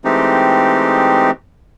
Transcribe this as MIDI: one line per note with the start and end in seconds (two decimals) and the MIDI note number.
0.05 1.31 52
0.05 1.31 56
0.05 1.31 57
0.05 1.31 60
0.05 1.31 63
0.05 1.31 67